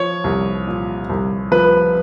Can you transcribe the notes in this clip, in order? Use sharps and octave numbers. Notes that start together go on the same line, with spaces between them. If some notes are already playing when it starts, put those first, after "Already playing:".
Already playing: F3 C#5
C2
A#2
C2
F3 B4